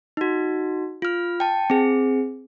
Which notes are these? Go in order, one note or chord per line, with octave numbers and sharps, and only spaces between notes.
D#4 F#4
F4 F6
G5 A5
C4 G#4